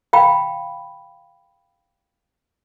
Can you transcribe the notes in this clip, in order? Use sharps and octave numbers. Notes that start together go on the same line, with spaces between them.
F5 G5 B5